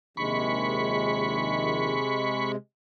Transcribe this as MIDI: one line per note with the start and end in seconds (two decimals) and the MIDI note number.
0.17 2.01 34
0.17 2.01 39
0.17 2.56 48
0.17 2.56 56
0.17 2.52 83
0.17 2.52 85